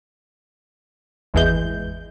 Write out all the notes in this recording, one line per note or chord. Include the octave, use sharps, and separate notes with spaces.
G#1 E2 E3 G#3 G6